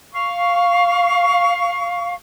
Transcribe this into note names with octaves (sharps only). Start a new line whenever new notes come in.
F5 C#6